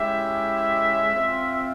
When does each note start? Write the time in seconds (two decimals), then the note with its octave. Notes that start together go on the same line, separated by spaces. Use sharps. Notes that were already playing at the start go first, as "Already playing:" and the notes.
Already playing: G#3 C#4 E4 G4 E5
1.15 C4 F4